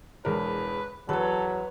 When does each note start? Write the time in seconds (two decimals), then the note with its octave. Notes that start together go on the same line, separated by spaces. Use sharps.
0.25 E1 E2 A#4 B4
1.09 E2 F#3 A4 B4 C#5